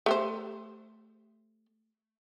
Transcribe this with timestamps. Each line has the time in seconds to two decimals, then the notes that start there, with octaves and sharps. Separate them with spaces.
0.06 A3 G4 C5